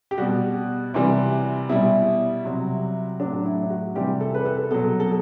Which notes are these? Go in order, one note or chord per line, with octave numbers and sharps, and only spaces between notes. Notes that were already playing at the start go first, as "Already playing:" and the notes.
G4
B2 G3 F#4
C3 E3 G3
B2 G3 E4
C3 F#3
A2 F#3 D4
E4
F#4
C3 E3 G3 G4
A4
B4
A4
B2 F#3 A4
A4